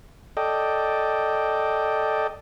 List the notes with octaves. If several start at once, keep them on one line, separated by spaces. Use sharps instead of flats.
A4 D5 D#5 G5